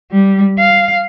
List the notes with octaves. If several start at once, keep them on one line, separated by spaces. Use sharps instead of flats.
G3
F5